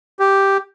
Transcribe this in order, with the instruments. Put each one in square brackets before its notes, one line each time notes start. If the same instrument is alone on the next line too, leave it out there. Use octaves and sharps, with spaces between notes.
[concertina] G4